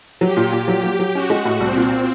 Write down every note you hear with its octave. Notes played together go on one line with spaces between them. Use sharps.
F#3 G4
A#2
A#2
F#3 G4
F#3
F#3
C#4 F#4
G#3
A2
C2 C4
A#2